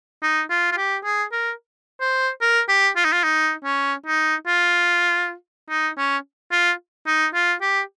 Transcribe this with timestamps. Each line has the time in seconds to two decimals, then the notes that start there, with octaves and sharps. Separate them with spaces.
0.23 D#4
0.50 F4
0.72 F4
0.77 G4
1.05 G#4
1.32 A#4
2.00 C5
2.41 A#4
2.69 G4
2.96 F4
3.05 D#4
3.12 F4
3.24 D#4
3.65 C#4
4.06 D#4
4.47 F4
5.69 D#4
5.98 C#4
6.52 F4
7.07 D#4
7.34 F4
7.61 G4